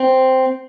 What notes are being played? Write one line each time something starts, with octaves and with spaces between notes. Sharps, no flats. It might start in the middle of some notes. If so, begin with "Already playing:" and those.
Already playing: C4